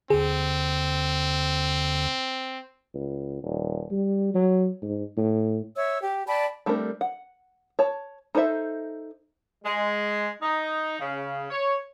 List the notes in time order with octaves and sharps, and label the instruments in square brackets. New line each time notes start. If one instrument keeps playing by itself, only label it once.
[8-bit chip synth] D#2 D3 [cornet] C4 [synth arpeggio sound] G#4
[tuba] C#2
D#1
G3
F#3
G#2
A2
[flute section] C#5 E5 E6
G4
D5 G5 A5 B5
[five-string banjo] G3 A3 C4 D4 A#4
F#5
C#5 A5
D#4 A4 C5 C#5 E5
[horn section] G#3
D#4
C#3
C#5